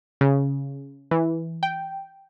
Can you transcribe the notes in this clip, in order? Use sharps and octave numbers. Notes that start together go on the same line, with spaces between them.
C#3
E3
G5